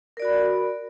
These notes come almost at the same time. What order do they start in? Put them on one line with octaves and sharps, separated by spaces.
A#4 D5 F#4 B5